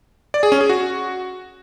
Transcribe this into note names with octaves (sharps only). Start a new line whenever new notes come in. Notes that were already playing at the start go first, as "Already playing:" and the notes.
D5
G#4
C#4
G#4
F#4